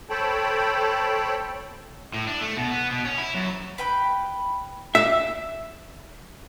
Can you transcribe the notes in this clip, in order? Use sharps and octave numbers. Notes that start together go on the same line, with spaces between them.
A4 C5 C#5 G5 A5 B5
A2
D4
A3
B2
B3
B2
C#4
E4
F#2
B4 G5 B5
E5 D6 E6